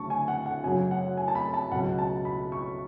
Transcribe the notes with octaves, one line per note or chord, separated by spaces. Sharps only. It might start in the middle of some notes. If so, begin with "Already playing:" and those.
Already playing: D2 C#3 F#3 A5 C#6
G#5
F#5
F#5
F#2 C#3 F#3 G#5
F#5
G#5
A5
B5
A5
C#2 B2 F#3 F#5
A5
B5
C#6